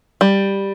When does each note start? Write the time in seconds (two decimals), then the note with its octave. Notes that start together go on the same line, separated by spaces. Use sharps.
0.21 G3